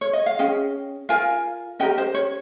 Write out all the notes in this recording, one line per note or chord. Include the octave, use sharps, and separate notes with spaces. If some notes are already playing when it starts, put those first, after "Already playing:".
C#5
D#5
F5
C#4 G#4 D#5 G5
F4 A#4 F5 G#5
C#4 G4 A#4 D#5 G5
C5 D#5
C#5